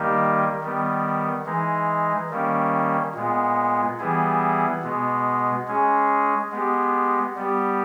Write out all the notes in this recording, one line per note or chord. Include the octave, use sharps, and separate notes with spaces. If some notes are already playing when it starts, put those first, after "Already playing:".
Already playing: D#3 G3 A#3 D#4 G4
D#3 G3 B3
E3 G#3 D#4
D#3 G3 A#3 C#4
A#2 G#3 B3
E3 G3 B3 E4 G#4
B2 G#3 B3
G#3 C#4 G#4
G#3 B3 G4
G3 B3 G4